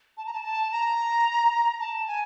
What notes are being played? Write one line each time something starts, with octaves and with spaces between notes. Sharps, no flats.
A5
A#5
A5
A5
A#5
A5
G#5